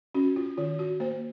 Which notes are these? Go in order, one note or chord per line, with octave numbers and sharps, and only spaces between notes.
C#4 F#4
F4
D#3 F4
F#4
A#3 C5